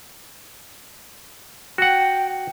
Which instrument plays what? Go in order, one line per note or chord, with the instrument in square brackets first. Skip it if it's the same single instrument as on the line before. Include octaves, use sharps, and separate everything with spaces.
[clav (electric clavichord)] F#4 F#5 [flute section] G5